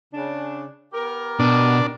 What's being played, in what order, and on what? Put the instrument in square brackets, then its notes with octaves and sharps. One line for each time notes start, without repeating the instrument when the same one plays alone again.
[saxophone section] C#3 D4
B3 G4 A#4
[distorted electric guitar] B2 [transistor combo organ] D4